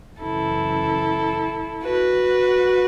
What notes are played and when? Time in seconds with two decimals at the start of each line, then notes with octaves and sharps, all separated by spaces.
0.20 F#2 C#3 E3 E4 A4
1.83 F#4 B4